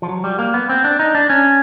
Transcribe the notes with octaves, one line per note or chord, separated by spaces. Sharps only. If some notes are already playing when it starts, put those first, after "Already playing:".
F3
F#3
G3
A#3
B3
C4
D4
D#4
D4
C#4